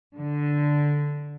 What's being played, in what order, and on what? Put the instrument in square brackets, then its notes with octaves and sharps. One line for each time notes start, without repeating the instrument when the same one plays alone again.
[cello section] D3